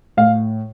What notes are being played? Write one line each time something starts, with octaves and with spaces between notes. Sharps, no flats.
A2 F5